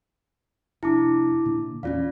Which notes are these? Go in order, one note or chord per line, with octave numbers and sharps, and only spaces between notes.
F1 D4 E4 A5 D6
A#2 D3
E2 C#4 F4 D5 F5